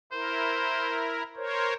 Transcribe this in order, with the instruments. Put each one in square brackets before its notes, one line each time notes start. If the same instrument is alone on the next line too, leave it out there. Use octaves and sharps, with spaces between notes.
[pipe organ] E4 A#4 [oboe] C5
[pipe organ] A#4 C5 C#5